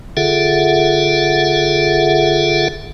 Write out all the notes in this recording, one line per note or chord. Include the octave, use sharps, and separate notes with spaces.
D3 F4 G#4 A4 E5 F#5